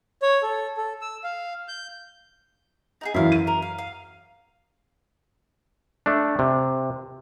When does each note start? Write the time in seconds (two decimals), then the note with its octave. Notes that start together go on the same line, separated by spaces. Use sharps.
0.22 C#5
0.43 A4
0.77 A4
1.01 E6
1.24 F5
1.68 G6
3.01 D#4 F#4 G#4
3.14 F#2 E3 E4 F5
3.32 D#7
3.47 A#4
3.62 F5
3.78 F5
6.06 A3 D4
6.39 C3